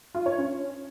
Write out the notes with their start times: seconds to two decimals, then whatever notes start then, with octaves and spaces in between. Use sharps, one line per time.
0.15 F4
0.26 C#5
0.37 C#4